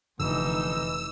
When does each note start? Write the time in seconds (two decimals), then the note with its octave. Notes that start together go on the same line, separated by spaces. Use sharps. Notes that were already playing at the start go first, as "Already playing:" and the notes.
0.20 F1 F2 D3 E3 D#4 E6